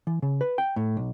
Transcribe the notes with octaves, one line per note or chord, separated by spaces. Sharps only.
E3
C#3
B4
G5
A2
B1